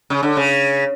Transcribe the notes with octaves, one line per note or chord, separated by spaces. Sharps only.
C#3
D3
C#3